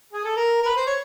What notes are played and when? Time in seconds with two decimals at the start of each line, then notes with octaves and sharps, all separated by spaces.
0.13 G#4
0.24 A4
0.36 A#4
0.62 A#4
0.66 B4
0.76 C5
0.87 C#5